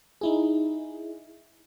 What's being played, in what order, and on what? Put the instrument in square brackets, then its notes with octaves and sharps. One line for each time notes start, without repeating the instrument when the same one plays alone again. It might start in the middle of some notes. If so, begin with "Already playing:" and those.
[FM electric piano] D#4 E4 G#4